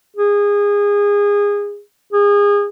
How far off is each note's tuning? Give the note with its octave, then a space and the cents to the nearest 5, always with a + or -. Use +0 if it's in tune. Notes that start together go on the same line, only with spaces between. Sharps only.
G#4 -25
G#4 -30